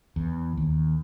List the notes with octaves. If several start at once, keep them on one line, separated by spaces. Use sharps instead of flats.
E2
D#2